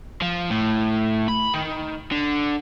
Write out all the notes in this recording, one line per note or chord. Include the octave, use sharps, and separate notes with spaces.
F3
A2
B5
D#3
D3